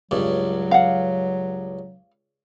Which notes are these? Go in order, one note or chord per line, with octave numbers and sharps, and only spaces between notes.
C#2 G2 F#3
F5 F#5